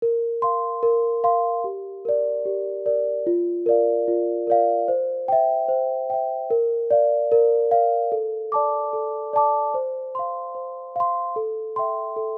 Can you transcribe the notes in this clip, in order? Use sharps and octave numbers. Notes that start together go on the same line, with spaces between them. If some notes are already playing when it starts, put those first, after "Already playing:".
A#4
F5 C6
A#4
F5 C6
G4
A#4 D5
G4
A#4 D5
F4
A#4 D5 F5
F4
A#4 D5 F5
C5
E5 G5
C5
E5 G5
A#4
D5 F5
A#4
D5 F5
A4
D5 A5 D6
A4
D5 A5 D6
C5
F5 C6
C5
F5 C6
A4
E5 G5 C6
A4